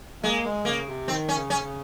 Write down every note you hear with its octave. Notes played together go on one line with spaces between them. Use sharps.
G#3 A#3
G#3
C#3 A#3
C3
D#3 C4
C#4
C#3
C#4
C#3